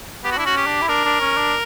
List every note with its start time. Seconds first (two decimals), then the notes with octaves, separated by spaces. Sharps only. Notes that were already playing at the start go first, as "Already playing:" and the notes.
0.24 B3 G4
0.32 F#4
0.37 D4 E4
0.46 C#4 F#4
0.57 G4
0.67 D4
0.82 E4
0.89 D4 A#4
1.05 D4
1.21 C#4
1.37 D4